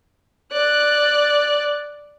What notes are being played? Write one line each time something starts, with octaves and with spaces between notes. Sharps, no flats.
D5 F#6